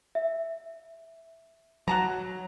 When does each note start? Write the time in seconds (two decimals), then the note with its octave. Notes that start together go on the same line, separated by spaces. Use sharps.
0.15 E5
1.88 F#3 F#4 A5 A#5